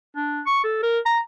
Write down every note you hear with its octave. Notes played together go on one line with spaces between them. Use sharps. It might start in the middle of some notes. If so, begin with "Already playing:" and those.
D4
C#6
A4
A#4
A#5